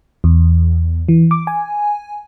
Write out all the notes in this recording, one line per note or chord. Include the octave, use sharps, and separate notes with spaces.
E2
E3
D6
G#5